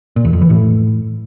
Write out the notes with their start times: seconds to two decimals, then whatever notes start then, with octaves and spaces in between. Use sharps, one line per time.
0.16 A#2
0.25 E2
0.33 F2
0.41 E3
0.50 A2